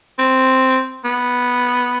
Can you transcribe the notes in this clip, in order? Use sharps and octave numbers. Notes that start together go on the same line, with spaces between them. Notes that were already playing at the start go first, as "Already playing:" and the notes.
C4
B3